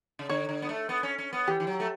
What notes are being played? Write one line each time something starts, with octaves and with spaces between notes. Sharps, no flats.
C#3
D3 C#5
D3
B3
A3
B3
C#4
C#4
B3
E3 G4
E3
F#3
A3